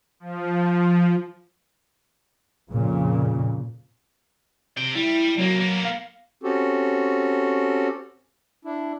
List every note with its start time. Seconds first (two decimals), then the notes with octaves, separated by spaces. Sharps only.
0.20 F3
2.71 F2 A#2 C#3
4.77 C3 G5
4.95 G3 E4
5.38 C3 F#3 A#3
5.60 A#3 B3
5.85 F5
6.43 C4 C#4 F#4 G4 A4
8.65 D4 E4